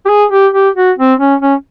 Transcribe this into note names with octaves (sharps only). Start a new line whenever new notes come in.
G4
G#4
G4
G4
F#4
C4
C#4
C#4